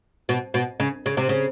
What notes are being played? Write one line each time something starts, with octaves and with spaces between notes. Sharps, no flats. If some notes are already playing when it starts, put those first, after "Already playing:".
B2
B2
C#3
C#3
C3
C#3